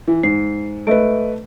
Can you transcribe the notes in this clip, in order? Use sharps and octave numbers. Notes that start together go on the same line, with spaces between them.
E3
G#2 C7
A3 B4 D#5 E5 D7